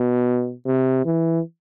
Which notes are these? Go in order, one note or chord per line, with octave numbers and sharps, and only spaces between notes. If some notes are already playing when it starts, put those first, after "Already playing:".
Already playing: B2
C3
E3